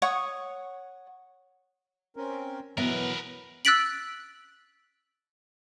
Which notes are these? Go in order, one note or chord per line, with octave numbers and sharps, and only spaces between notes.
C#5 F#5 C#6 D#6
C4 C#4 A#4
B2 E3 F#3 B3 A#4 B4 E5
E6 F#6 A6 B6 D7 F#7